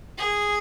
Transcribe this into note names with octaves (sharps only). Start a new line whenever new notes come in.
G#4